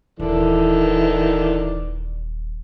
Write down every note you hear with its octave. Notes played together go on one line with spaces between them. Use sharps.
D#1 D#3 E3 A4 D5